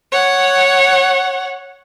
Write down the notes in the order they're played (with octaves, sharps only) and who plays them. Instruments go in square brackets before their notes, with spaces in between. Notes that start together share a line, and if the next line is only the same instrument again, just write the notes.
[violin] C#5 F#5